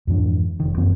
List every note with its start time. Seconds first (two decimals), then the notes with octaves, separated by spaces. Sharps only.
0.07 F2 G#2 E3 D4
0.60 F1 D#3
0.77 F#2 E3 A#3 C4